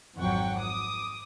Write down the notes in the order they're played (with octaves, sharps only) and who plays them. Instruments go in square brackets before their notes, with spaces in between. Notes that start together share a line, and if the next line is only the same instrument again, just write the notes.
[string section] G#1 F2 F#3 F#5 G5 C#6
D6 D#6